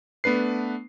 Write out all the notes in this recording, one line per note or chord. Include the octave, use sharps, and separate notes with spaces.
A3 B3 D4 B4 C7